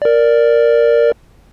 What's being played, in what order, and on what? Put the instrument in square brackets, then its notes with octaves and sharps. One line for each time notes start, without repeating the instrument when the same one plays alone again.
[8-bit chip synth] A#4 D5